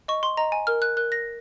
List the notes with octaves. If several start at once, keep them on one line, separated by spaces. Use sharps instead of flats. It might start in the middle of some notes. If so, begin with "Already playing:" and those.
D#5 C#6
C6
D#5 A#5
G#5
A#4 F6
F#6
A#4 F#6
A#6